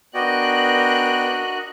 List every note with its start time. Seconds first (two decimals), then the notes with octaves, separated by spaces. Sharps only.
0.14 B3 D4 F#4 A#4 D5 D#5 G5 F#6